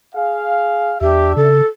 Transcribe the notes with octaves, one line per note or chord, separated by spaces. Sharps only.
G#4 F5
E2 D4 G4 E5
C#3 A4